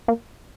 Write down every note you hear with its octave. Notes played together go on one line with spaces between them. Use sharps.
A#3